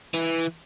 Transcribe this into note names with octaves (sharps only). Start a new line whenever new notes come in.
E3